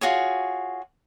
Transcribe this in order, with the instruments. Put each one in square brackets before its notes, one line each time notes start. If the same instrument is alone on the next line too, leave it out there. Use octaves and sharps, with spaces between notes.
[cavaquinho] F4 F#4 G#4 C#5